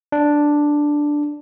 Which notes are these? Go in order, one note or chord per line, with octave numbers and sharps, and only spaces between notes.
D4